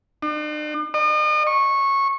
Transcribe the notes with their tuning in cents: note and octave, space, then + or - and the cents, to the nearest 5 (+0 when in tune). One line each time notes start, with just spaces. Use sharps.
D4 +45
D#5 -40
C#6 -15